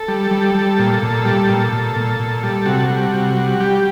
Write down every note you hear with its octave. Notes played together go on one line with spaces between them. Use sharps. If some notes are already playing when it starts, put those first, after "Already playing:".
Already playing: A4
G3
G3
G3
A#2
A#2
G3
A#2
A#2
A#2
A#2
G3
C3 F#4
G3
C3
G3
G3 G4